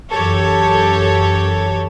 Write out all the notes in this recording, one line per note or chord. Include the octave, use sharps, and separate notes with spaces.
F#2 E3 G4 A4 C#5